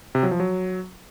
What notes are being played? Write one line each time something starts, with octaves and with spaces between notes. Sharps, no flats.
C3
F#3
F3
F#3